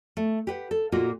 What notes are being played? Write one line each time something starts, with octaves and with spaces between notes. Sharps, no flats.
A3
G4 B4 F#5
A4
A#2 A#3 D#4 F4 F#4